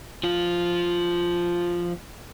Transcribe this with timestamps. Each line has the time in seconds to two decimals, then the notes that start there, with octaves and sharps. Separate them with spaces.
0.23 F3 F4